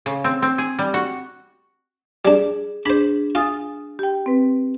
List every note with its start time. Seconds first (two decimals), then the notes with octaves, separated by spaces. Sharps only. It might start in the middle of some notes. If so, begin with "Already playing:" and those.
0.06 C#3
0.24 C4
0.42 C4
0.58 G#4
0.79 G3
0.94 F#4
2.25 G3 D4 G#4
2.86 D4 G#4 C5 B5
3.35 F4 G#5 D#6 A6
3.99 G4 G5
4.26 C4 B4